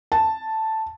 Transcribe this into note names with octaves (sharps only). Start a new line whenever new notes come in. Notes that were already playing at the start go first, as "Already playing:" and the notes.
A5